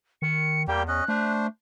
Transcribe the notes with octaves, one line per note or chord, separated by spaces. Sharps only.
D#3 C#7
E2 G3 A#3 G4 G5
C#4 D#5 F#6
A3 D4 C5